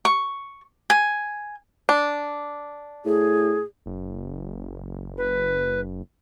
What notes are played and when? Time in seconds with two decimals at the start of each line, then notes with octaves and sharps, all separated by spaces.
0.05 C#6
0.90 G#5
1.89 D4
3.05 A2 G#4
3.86 F#1
5.17 B4